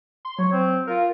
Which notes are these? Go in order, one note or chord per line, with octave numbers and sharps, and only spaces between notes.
C6
F#3 C#5
C4
F4 A#4